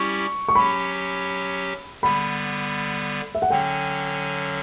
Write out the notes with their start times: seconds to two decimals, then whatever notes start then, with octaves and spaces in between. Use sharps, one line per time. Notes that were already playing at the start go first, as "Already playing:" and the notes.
Already playing: G3 C#4 E4 G4 C#6
0.49 C#6
0.55 F#3 C#4 G4 B5
2.03 D3 G3 B3 B5
3.35 E5
3.42 F#5
3.50 D3 F#3 C#4 G5